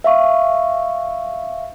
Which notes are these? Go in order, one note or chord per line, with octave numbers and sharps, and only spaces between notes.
E5 F5 C#6